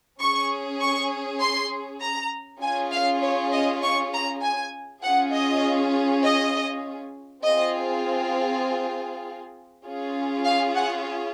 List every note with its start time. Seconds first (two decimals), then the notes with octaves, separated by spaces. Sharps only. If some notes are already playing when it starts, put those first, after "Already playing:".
0.21 C#4 G#4 C#6
0.81 C#6
1.41 C6
2.01 A#5
2.61 C#4 F4 G#4 G#5
2.91 F5
3.22 C#5
3.52 D#5
3.83 C#6
4.13 A#5
4.42 G#5
5.03 C#4 F4 G#4 F#5
5.33 D#5
6.23 D#5
7.43 C4 F4 G#4 D#5
9.85 C#4 F4 G#4
10.45 F5
10.75 F#5